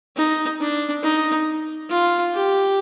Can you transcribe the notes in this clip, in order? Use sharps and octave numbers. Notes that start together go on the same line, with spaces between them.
D#4
D4
D#4
F4
G4